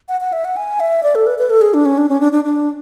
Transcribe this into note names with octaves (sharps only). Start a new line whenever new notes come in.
F#5
F#5
E5
F#5
G#5
E5
D5
A4
B4
B4
A4
G#4
D4
C#4
D4
C#4
D4
D4
D4